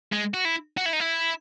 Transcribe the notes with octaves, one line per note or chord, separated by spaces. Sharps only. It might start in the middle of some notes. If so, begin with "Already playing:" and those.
G#3
F#4
E4
F#4
E4
D#4
E4